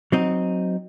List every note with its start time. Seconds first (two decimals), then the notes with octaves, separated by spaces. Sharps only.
0.12 F#3 C4 D#4